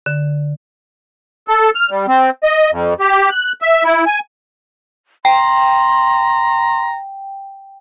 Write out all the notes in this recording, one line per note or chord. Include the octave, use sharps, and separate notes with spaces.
D3
A4
F6
G3
C4
D#5
F2
G4
F#6
E5
E4
G#5
G5 A#5 C6